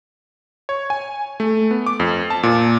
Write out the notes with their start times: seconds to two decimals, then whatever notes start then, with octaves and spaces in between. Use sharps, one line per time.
0.69 C#5
0.90 G#5
1.40 A3
1.71 B3
1.86 D6
2.00 F2
2.30 A5
2.43 A#2